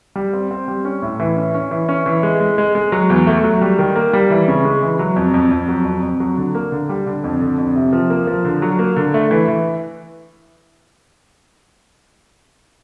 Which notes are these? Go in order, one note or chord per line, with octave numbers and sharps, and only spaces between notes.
G3
C4
C4
G3
C#4
A2
E3
C#4
C#4
E3
C#4
E3
G#3
G#3
G#3
G#3
F#3
E2
A3
F#3
G3
D#3
A#3
G3
E3
C#3
G#3
E3
F#3
F2
F2
F2
F#3
F2
F2
F#3
D3
A#3
D3
G3
D3
F2
D3
F2
C3
F3
A#3
F3
D3
F#3
A#3
D3
A3
E3
E3